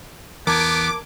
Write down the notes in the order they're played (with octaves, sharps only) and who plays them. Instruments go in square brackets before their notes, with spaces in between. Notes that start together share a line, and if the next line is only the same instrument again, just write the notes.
[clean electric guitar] E2 [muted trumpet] B3 [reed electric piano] A#4 A5 G#6 [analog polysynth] D6